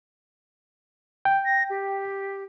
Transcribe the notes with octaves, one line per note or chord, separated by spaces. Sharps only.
G5
A#6
G4